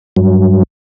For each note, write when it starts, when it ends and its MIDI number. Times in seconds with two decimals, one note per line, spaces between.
0.16 0.63 43
0.16 0.63 54